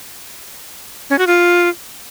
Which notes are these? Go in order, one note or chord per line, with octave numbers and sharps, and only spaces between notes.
C#4
F#4
F4